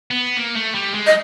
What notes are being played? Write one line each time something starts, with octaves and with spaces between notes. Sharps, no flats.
B3
A#3
A3
G3
G#3
D#5